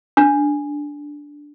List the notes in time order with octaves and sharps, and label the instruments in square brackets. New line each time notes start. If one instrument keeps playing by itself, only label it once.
[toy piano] D4